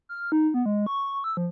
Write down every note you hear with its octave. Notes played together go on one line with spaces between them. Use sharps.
F6
D#4
B3
G#3
C#6
E6
F3